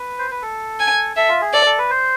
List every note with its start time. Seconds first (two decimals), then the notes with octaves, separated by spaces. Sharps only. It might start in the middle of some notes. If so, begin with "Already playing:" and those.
Already playing: B4
0.19 C5
0.31 B4
0.42 A4
0.80 G#5
1.17 A4 E5
1.29 F4
1.41 G#4
1.53 A4 D5
1.66 A4
1.78 B4
1.91 C5